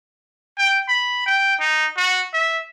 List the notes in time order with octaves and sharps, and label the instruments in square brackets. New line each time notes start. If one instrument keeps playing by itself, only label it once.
[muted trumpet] G5
B5
G5
D#4
F#4
E5